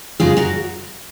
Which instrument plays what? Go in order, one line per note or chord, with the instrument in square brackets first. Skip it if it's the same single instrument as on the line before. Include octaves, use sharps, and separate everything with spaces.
[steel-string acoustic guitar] F#2 C#3 G#3 F4 G#4
F#4 A#4